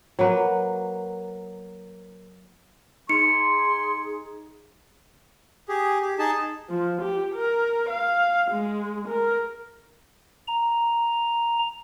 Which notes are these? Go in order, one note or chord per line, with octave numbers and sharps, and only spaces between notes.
F#3 A#3 B4
D#4 G#4 C6 C#7
G4 G#4
G4
D#4 G#4 A5
F3
G4
A#4
F5
G#3
A#4
A#5